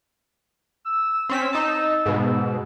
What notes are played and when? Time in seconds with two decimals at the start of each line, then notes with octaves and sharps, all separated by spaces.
0.85 E6
1.29 C4 C#4 B6
1.53 D#4 A5
2.06 G#2 B2